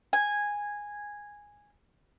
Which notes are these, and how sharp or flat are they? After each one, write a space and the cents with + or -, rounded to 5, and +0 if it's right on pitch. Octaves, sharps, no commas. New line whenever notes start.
G#5 -10